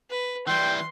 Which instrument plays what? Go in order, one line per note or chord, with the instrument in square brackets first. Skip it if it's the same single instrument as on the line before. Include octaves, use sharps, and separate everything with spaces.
[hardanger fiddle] B4
[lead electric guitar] E3 G3 [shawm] G5 [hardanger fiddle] C6